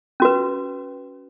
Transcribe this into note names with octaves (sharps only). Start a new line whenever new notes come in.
C#4 F#4 B4